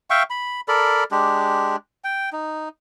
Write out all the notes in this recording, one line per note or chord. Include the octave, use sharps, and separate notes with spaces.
E5 F5 G5 C#6
B5
A4 A#4 D5 B5
G#3 D4 G4
G5
D#4